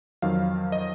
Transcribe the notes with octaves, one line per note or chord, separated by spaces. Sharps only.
F2 D#3 F#3 F5
D#5